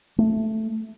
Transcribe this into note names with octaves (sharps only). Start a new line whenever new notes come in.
A3